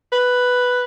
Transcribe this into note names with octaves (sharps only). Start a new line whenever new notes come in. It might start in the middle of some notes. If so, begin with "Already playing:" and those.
B4